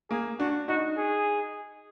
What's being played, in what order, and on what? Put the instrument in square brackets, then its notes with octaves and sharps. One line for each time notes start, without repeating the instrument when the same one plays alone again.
[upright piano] A#3 [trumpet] G#4
[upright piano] D4 [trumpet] F#4
[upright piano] D#4 [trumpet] F#4
[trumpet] G#4